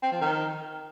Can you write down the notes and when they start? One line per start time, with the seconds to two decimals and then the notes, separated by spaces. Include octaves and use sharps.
0.02 C4
0.12 F3
0.21 D#3